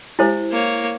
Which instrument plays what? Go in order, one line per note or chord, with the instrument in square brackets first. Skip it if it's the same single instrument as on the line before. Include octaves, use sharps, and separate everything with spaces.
[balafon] G#3 G4 G#5 [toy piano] E4 C5
[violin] A#3 C#5